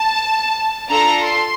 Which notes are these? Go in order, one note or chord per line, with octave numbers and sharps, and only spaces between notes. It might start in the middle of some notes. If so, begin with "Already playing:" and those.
Already playing: A5
D4 F4 A4 A#5
C6